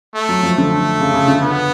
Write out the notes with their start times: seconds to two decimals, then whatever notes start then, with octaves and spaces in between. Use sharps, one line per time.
0.15 A3
0.29 F#3
0.43 F3
0.58 D3 A3
1.00 C#3
1.14 C#3
1.28 D3
1.42 B3